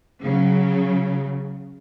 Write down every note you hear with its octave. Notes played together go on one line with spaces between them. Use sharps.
C#3 F#3